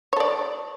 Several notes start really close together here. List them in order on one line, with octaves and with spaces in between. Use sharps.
C#5 A4 D5